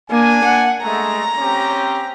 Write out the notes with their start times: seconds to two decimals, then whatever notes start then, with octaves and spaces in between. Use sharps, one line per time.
0.11 A#3 D4 G#5
0.45 F#5
0.82 G#3 A3 A#5
1.39 C4 C#4 G4